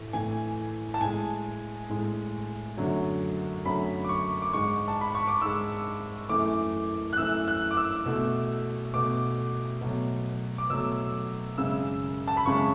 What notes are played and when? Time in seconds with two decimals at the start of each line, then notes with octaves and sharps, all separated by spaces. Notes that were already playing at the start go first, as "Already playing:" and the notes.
Already playing: A2 E3 A3
0.13 A2 E3 A3 G#5
0.94 A5
1.01 A2 G#3 G#5
1.90 A2 G#3
2.77 F#2 D3 F#3 A3
3.65 F#2 D3 F#3 A3 B5
4.04 D6
4.09 C#6
4.42 D6
4.53 G#2 G#3 C#6
4.88 A5
5.01 B5
5.15 C#6
5.28 D6
5.41 G#2 G#3 E6
6.29 F#2 E3 A3 D6
7.13 F#6
7.17 F#2 E3 A3 E6
7.48 F#6
7.71 D6
7.77 E6
8.06 B2 A3
8.94 B2 A3 D6
9.81 B2 F#3 A3
10.58 D6
10.70 B2 F#3 A3 E6
11.58 F#2 C#3 G#3 E6
12.28 A5
12.37 B5
12.46 F#2 C#3 G#3 C#6